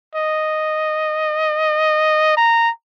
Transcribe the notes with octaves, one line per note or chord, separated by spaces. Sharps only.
D#5
A#5